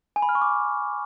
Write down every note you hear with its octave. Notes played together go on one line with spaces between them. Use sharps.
G#5
B5
F6
C#6
D6